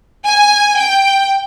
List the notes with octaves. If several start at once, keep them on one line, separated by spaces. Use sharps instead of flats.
G#5
G5